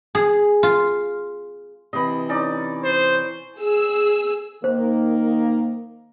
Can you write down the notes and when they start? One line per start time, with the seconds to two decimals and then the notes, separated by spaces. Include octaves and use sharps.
0.15 G#4
0.63 F4
1.93 C3 E3 D#5 B5
2.29 C#4 D#4 D5
2.84 C5
3.59 G#4 E6
4.64 D#3 A#3 A#4 C5